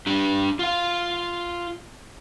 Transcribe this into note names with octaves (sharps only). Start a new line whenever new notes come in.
D4 G4
F4 F5